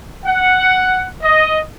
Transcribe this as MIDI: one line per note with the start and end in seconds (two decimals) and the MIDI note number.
0.24 1.07 78
1.22 1.59 75